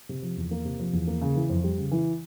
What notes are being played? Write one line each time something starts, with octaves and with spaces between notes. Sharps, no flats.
C3
F3
E2
A#3
C3
F3
E2
A#3
C#3
E3
F2
G3
C#3
E3